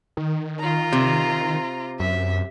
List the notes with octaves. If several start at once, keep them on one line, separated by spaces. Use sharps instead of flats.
D#3
F4 A#5
C3
F#2 E5